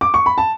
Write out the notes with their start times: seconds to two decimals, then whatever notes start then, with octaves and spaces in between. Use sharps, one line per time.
0.01 D6
0.14 C#6
0.26 B5
0.38 A5